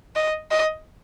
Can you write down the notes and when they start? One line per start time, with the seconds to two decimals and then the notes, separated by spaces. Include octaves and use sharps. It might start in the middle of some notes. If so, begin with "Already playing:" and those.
0.16 D#5
0.51 D#5